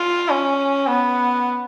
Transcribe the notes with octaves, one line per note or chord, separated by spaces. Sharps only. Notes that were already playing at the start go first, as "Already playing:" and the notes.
Already playing: F4
C#4
B3